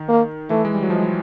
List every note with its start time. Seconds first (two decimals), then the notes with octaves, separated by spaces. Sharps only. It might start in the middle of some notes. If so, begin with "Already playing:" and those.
Already playing: D#3
0.08 A#3
0.50 E3 A3
0.65 G#3
0.74 G3
0.83 F#3
0.90 F3 G#3